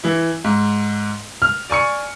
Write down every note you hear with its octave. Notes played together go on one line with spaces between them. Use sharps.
E3 E4
G#2
F6
D5 G#5 C#6 C#7